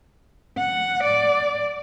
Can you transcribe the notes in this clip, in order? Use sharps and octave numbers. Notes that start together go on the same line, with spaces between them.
F#5
D5